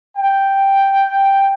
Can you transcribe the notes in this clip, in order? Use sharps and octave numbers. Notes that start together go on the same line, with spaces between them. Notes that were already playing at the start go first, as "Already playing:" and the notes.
G5